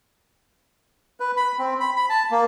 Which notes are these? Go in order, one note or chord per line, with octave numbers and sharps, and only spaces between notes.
B4
B5
C4
B5
B5
A5
A#3